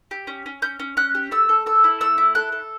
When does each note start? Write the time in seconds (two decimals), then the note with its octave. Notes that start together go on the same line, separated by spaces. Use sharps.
0.11 G4
0.27 C#4
0.46 C#4
0.62 C#4 G6
0.80 C#4
0.97 C#4 F#6
1.15 G4
1.31 A3 E6
1.49 A4
1.66 A4 E6
1.84 E4
2.01 A3 E6
2.18 E4
2.35 A4 F#6
2.52 A4